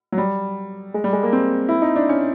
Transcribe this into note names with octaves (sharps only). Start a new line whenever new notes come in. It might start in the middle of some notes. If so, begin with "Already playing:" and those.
F#3
G3
G#3
G3
G#3
A#3
C4
E4
D#4
D4
C#4